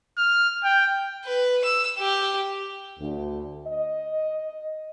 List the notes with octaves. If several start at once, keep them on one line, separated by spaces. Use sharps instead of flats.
F6
G5
B4
E6
G4
D2
D#5